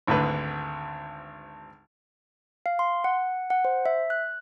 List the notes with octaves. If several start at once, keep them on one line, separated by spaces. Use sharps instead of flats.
G#1 D2 D3 B4
F5
C6
F#5
F#5
C5
E5
F#6